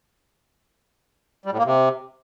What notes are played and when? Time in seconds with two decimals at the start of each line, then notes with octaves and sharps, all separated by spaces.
1.45 G3
1.52 A2
1.59 A#3
1.65 C3